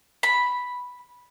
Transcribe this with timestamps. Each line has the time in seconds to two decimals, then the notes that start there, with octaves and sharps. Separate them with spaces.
0.23 B5